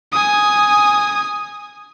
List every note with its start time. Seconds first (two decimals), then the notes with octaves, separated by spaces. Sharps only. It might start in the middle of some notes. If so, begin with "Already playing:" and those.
0.12 G#5 D#6